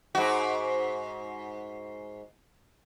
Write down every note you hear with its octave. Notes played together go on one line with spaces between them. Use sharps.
G#2 F#4